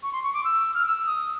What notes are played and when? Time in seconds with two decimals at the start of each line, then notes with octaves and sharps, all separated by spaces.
0.03 C#6
0.13 C6
0.23 C#6
0.34 D6
0.44 E6
0.74 F6
0.86 E6
1.06 D#6